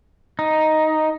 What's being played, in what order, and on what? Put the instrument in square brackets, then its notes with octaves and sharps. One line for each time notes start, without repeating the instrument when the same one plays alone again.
[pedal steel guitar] D#4